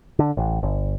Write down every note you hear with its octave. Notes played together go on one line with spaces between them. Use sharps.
D3
A1
G1